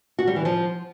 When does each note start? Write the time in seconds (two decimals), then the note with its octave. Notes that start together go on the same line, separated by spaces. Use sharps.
0.19 F#4
0.27 G3
0.36 E3
0.45 F3